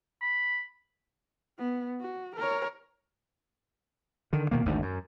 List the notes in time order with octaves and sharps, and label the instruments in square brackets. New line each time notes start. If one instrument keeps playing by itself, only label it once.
[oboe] B5
[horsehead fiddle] B3
F#4
A#4 C#5
[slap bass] D3 D#3
B2 D#3 A#3
G#1 D2 G#2
F#2